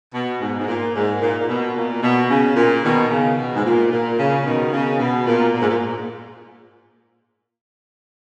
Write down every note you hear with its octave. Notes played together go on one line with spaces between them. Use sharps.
B2
G#2
G#2
A#2
G#2
A#2
A#2
B2
A#2
B2
C#3
A#2
B2 D#3
C#3
B2
G#2
A#2
A#2
C#3
B2 D#3
C#3
B2
A#2
A#2
G#2
A#2